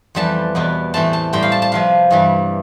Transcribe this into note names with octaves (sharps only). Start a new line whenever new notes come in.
F2 E3 G3 B3 A5
E2 B2 B3
A2 E3 A3 C4 A5
A5
A2 G3 C4 G5
F5
A5
A5
C3 F3 B3 F5
G2 E3 G3